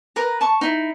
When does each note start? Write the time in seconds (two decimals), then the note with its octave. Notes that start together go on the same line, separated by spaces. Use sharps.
0.16 A#4 B4 A#5
0.41 A5 C#6
0.61 D#4 E4